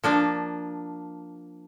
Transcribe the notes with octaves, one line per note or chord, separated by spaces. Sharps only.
F3 A#3 D4